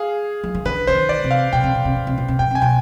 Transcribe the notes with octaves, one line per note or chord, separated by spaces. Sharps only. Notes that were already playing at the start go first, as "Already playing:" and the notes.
Already playing: G#4 F5
F3
D#3
D3 B4
D3 C5
D#3
D5
C3
F5
B2 G5
C3
B2
C3
B2
C3
B2
C3
B2 G5
C3 G#5
B2 G5